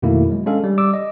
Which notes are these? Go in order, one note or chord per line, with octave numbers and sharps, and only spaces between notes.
F2 B2 D#3 A3 A#3 E4
F#3 G#3
G#3 C#4 D4 A4 F5
G3
G3 D5 D6 E6
D#5